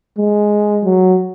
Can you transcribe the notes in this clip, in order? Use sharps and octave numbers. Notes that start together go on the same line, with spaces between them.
G#3
F#3